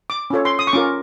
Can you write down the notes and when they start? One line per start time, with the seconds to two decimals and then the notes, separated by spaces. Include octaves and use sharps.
0.10 D6
0.30 C#4 F4 A4 C#5
0.45 C6
0.59 D#6
0.67 C#6
0.73 C#4 F4 A#4 D6